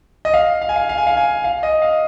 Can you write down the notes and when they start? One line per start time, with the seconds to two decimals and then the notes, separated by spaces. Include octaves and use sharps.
0.25 D#5
0.34 F5
0.61 F5
0.69 G#5
0.76 F5
0.89 F5
0.98 G#5
1.07 F5
1.17 G#5
1.44 F5
1.63 D#5
1.82 F5